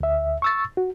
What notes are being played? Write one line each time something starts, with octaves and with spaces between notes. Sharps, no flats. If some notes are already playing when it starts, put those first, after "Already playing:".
D2 E5
C#6 E6 A6
F#4